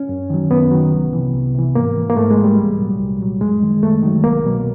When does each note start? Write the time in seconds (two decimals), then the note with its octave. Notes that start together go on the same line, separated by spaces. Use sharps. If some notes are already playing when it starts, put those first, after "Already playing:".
Already playing: C#4
0.09 F#2
0.30 D#3 F#3
0.51 F#2 B3
0.71 D#3 F#3
0.92 C2
1.13 C3 E3
1.34 C2
1.55 C3 E3
1.75 G#2 A#3
1.97 E3
2.09 A#3
2.17 G#2 A3
2.31 G#3
2.38 E3
2.44 G3
2.58 C2
2.79 A#2 F#3
2.99 C2
3.20 A#2 F#3
3.41 F#2 G#3
3.62 D#3 F#3
3.83 F#2 A3
4.03 D#3 F#3
4.24 C2 A#3
4.45 B2 F#3